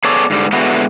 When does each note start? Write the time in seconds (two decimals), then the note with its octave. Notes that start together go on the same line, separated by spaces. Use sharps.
0.04 B3 G#4 A4 C#5 D5
0.30 G#2 D3 G3
0.53 D3 G#3 B3 E4 F#4